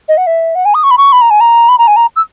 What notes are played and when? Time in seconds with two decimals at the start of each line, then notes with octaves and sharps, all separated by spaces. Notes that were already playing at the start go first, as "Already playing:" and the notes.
0.09 D#5
0.17 F#5
0.27 E5
0.55 F#5
0.65 G#5
0.74 D#6
0.84 C#6
0.91 B5
0.98 C#6
1.12 B5
1.21 A#5
1.30 G#5
1.41 A#5
1.69 B5
1.78 A#5
1.87 G#5
1.96 A#5
2.16 E6